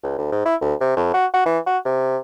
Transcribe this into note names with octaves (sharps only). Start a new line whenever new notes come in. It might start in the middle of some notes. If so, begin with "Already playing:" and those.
C#2
D2
G#2
E4
D2
C3
F2
F#4
F#4
E3
F#4
C3